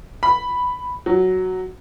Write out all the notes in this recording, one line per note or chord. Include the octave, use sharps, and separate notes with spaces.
B5
F#3